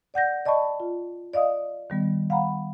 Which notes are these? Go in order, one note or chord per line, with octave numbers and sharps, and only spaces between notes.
D5 F#5 G6 A#6
D5 D#5 A5 B5 C#6
F4
D5 D#5 F5 D#6
D#3 G3 B3
F5 F#5 A#5 B5